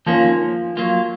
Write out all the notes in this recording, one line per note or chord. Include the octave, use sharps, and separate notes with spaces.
D#3 F3 A#3 C#4 F4
F#3 A#3 F4